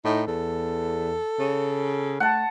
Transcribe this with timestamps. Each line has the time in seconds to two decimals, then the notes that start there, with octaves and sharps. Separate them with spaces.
0.05 A2 D#4
0.28 E2 A4
1.40 C#3
2.20 A3 F#5 A5